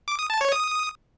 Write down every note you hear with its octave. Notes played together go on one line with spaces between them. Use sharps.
D6
D#6
A5
C#5
D#6